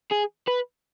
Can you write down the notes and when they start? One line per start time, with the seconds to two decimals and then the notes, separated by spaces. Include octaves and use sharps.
0.11 G#4
0.47 B4